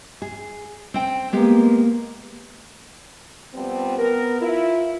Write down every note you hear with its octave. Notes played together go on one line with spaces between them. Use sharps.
G#4
C4 G5
G#3 A#3 B3 G4
F3 G3 B3 C4
B3 A#4
E4 F4